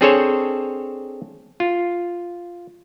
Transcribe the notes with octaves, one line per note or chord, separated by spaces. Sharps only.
C4 D4 G#4 A4 C5 C#5
F4